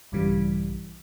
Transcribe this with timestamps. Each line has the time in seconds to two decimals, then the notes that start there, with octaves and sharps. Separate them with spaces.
0.12 A#1 G2 C#3 E3 G3